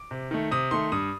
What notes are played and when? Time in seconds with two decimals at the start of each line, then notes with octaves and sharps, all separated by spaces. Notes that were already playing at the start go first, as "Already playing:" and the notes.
Already playing: D6
0.11 C3
0.31 D#3 A3
0.51 C3 D#6
0.71 D#3 A3 C6
0.92 G2 D#6